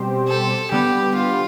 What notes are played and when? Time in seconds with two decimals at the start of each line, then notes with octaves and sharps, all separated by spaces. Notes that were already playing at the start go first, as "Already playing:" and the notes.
Already playing: B2 G3 C4 G4 C5
0.28 A4
0.72 D3 G3 B3 G4
1.16 F4